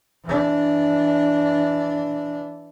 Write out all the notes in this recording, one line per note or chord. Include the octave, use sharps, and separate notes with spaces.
E3 D4